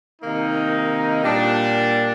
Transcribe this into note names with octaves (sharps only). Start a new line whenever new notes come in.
C3 D#3 A#3 D#4
A#2 G3 D4